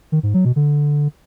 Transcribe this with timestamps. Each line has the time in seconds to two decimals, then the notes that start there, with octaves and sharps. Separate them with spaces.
0.12 D#3
0.23 G#2
0.34 F#3
0.45 B2
0.56 D3